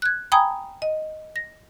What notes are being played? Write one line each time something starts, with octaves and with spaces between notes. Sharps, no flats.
F#6 G#6
G5 G#5 A#5 B5 D#6 G#6
D#5
A#6